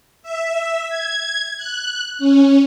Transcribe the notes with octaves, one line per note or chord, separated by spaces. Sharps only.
E5
G#6
F#6
C#4